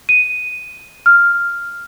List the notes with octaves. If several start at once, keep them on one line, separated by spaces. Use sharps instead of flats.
D#7
F6